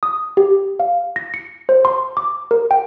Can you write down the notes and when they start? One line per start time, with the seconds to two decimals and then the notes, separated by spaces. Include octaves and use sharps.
0.03 D#6
0.37 G4
0.80 F5
1.16 A#6
1.34 C#7
1.69 C5
1.85 C6
2.17 D6
2.51 A#4
2.71 G5